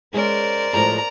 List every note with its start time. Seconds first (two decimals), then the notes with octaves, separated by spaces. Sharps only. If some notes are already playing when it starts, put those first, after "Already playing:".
0.14 G#3 C#4 A#4 C5 D5
0.73 A2 F3 G#3 A#5